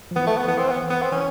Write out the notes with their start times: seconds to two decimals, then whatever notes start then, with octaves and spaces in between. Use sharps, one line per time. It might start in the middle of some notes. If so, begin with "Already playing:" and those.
0.11 F3
0.16 E3 B3
0.27 A3
0.38 B3
0.48 E3 B3
0.58 C4
0.69 B3
0.90 B3
1.02 C4
1.12 E3 C#4